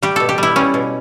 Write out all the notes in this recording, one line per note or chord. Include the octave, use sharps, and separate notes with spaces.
G3 G4
B2 A4
G4
G3 E4
G3 C#4
B2